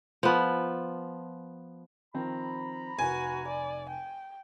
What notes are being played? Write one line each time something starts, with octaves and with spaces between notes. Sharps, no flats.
F3 B3
D#3 F3 C4 A#5 B5
F1 F#4 B4 G#5
D5
G5